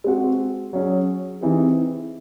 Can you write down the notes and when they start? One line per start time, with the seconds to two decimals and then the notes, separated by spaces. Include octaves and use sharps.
0.04 G#3 C4 F#4
0.73 F#3 C#4 G#4
1.41 C3 E3 C4 D#4 G#4